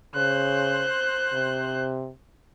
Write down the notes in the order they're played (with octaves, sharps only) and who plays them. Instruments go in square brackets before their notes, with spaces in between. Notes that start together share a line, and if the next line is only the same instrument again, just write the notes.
[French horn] C#3 [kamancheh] C5 F#6
[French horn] C3